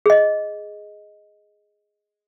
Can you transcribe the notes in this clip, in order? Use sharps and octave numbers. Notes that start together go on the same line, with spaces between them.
G#4 D#5